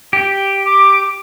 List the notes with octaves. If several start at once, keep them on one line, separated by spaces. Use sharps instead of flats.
G4
D6